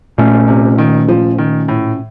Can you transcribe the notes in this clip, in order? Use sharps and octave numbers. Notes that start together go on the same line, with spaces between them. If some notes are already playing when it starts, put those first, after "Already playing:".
A#2 A3 C#4
C3
D#3
F3
D#3
A2